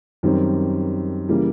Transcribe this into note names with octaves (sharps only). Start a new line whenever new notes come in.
F#2 D#3 G3 C4
C#3 E3 G3 A#3